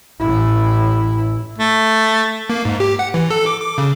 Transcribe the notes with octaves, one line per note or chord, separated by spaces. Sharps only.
A1 E4
A3
A#3
G#2
G4
F#5
E3
A4
D6
D6
C#3